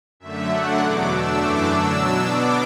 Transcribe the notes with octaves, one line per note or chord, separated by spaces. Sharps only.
F#2 D3 A3 E5
D3 F#3 A3 D4 F#5
E2 B2 F#3 D6
B2 A3 D4 E6
F#2 E3 A3 D4 D6
D3 F#3 D4 E6
B2 F#3 D4
B2 B3 D4 D6